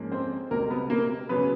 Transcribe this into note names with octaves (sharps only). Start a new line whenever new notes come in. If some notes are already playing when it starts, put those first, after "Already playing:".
Already playing: G#2 F3 A#3 C#4
C4 C5
C#2 B2 G3 A#3 C4 A#4
B3 B4
A#3 A#4
C#3 F#3 B3 B4